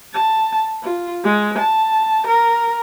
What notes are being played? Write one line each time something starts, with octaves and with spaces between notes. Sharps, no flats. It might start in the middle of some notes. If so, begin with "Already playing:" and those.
A5
F4
G#3
A5
A#4